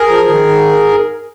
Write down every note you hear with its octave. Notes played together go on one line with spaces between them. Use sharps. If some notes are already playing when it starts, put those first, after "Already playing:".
Already playing: G#4 A#4
F3
D#3
G#2